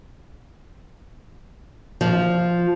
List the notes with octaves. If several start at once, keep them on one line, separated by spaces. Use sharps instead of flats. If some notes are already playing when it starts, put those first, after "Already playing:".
F3